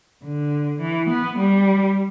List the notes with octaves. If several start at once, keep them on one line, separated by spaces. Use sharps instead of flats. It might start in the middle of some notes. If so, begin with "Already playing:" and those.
D3
E3
B3
G3